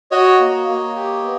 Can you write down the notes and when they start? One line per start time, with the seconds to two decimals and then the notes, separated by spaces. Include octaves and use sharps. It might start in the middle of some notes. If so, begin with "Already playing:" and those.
0.11 F#4 C#5 D#5
0.40 A#3
0.68 A#3
0.96 G4
1.24 B3